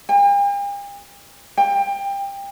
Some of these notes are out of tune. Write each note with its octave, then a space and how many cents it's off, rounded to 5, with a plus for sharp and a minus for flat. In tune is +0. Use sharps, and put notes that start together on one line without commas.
G5 +45
G5 +20